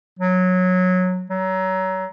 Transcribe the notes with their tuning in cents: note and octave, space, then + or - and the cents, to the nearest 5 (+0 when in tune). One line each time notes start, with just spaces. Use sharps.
F#3 -15
F#3 +25